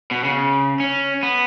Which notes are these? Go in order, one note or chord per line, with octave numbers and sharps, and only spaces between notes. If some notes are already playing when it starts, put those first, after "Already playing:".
B2
C#3
C#4
B3